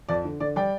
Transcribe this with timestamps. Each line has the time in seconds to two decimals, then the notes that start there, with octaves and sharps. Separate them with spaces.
0.09 F2 D5
0.25 D3
0.40 D3 D5
0.56 G3 D5 G5